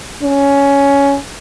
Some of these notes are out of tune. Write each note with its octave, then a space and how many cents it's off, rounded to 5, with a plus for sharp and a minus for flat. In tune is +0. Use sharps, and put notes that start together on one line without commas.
C#4 +10